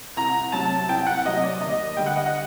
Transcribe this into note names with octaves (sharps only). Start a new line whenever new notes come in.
C2 A#5
C3 F#3 A5
C2 G5
F#5
C3 F#3 D#5
D5
D#2 D#5
D3 G3 D4 G5
F#5
D#5
F#5